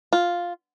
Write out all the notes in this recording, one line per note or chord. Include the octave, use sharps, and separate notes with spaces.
F4